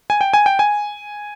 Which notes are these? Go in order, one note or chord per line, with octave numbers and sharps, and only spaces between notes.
G#5
G5
G#5
G5
G#5